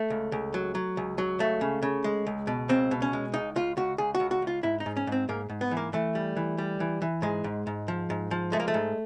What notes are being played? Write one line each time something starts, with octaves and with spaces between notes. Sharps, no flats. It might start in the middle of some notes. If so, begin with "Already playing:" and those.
Already playing: A3
C#2
C#2
F#3
F#3
C#2
F#3
C#2 A3
C#3
C#3
G#3
C#2
B2
C#2 C4
B2
C#4
G#3
C#2 D#4
C#2 F4
C#2 F#4
C#2 G#4
F#4
C#2
F#4
C#2 F4
G#2 E4
D#4
G#2
C#4
G#2 C4
G#2 A#3
G#2
B3
E3
A#3
E3 A3
G3
E3
G3
E3
E3
G#2 G#3
G#2
G#2
F3
G#2
F3
G#3 A3
A#3
A3
G#2